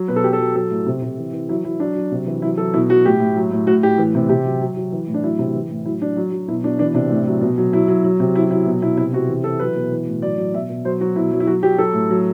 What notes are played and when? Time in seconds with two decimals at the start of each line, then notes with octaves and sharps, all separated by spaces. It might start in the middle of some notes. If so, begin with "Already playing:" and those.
Already playing: F#3
0.08 B2 B4
0.16 A4
0.24 F#3 G4
0.33 A4
0.40 F#3
0.55 F#3 A4
0.71 A2
0.86 C3
1.02 C3
1.18 E3
1.33 E3
1.49 F#3 E4
1.64 F#3 E4
1.79 F#3 D4
1.95 F#3
2.12 C3
2.26 E3
2.42 F#3 E4
2.57 F#3 A4
2.74 B2 E4
2.89 F#3 F#4
3.05 A2 G4
3.20 A2
3.36 F#3
3.51 A2
3.67 A2 F#4
3.83 A2 G4
3.98 E3
4.15 C3
4.29 C3 G4
4.45 F#3
4.61 F#3
4.77 F#3
4.92 E3
5.08 A2
5.14 D4
5.23 F#3 E4
5.39 C3
5.54 E3
5.71 A2
5.85 F#3 E4
6.02 F#3 D4
6.17 F#3
6.32 F#3
6.48 B2 E4
6.64 B2 D4
6.79 E3 D4
6.94 C3 D4
7.10 A2
7.27 F#3
7.41 B2
7.58 F#3
7.73 F#3 E4
7.88 F#3
8.04 F#3
8.20 C3
8.35 F#3 E4
8.50 F#3 E4
8.66 B2
8.82 B2 E4
8.97 C3 E4
9.13 C3 F#4
9.28 E3
9.44 E3 A4
9.59 F#3 B4
9.76 B2
9.92 E3
10.07 A2
10.22 F#3 D5
10.38 F#3
10.54 B2 E5
10.69 B2
10.85 F#3 C5
11.01 F#3 F#4
11.15 B2 E4
11.32 F#3
11.40 E4
11.47 F#3 F#4
11.63 F#3 G4
11.78 F#3 A4
11.93 A2
12.10 F#3